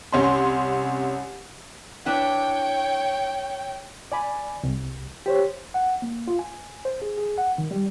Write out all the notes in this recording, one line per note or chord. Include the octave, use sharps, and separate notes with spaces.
C2 C#4 C6
D4 E4 B4 C#5 G5
D5 G#5 B5
C2
G4 C5 C#5
F#5
A#3
F4
G#5
C5
G#4
G#4
F#5
D#3
G3